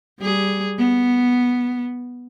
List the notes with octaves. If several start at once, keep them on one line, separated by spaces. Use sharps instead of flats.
G3 G#4
B3